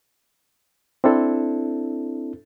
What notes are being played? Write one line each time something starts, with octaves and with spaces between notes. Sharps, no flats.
C4 D4 E4 A4